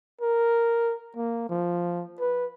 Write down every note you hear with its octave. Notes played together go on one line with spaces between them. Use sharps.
A#4
A#3
F3
B4